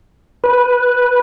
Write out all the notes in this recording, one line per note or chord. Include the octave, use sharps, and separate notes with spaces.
B4